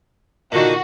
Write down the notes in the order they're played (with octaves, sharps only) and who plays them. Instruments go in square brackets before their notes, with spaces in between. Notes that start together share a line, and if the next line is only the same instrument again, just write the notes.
[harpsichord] A#2 D3 D#3 [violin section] F#4